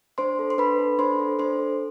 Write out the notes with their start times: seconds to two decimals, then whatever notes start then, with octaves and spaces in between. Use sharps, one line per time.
0.18 D4 C5 C6
0.39 A4
0.50 C6
0.58 D4 B4 B5
0.79 A4
0.99 D4 C5 C6
1.19 A4
1.39 D4 C5 C6
1.59 A4